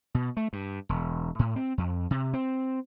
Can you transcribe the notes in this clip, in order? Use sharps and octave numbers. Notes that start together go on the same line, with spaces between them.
B2
A3
G2
E1
A2
C4
F2
C3
C4